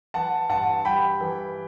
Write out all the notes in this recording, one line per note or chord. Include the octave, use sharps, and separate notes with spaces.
E3 F#5 A5
G2 F#5 A5
G3 G5 B5
E3